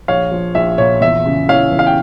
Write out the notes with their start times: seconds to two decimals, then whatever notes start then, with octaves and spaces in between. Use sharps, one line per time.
0.08 A#1 C#5 F5
0.31 F3
0.55 A#1 E5
0.78 A#2 C#5
1.01 E2 E5
1.26 C#3
1.49 E3 C#5 F5
1.72 E3
1.79 F5
1.87 G5